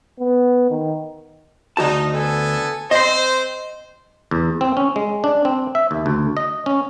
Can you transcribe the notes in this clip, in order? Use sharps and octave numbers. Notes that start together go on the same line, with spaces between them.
B3
D#3
D2 D#4 F#4 A5
B3 A4 G#5
C4 C5 D#5 C6
E2
C4
C#4
G#3
D4
C4
E5
D#2
D2
D#5
C#4